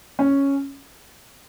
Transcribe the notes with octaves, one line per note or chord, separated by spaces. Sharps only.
C#4